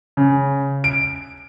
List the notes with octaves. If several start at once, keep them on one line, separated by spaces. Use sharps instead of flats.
C#3
D7